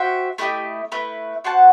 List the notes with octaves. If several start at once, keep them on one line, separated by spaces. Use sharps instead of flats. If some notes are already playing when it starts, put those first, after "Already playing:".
Already playing: F#4 C5 E5 G5
A3 E4 G4 D#5
A3 E4 B4
F#4 C5 F#5 A5